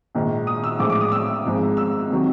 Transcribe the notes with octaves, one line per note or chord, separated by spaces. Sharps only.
A#1 G#2 D#3
D#6
E6
A1 A2 F3 G#3 D6
D6
D#6
E6
G#1 G#2 F3 G#3
E6
C3 D#3 F#3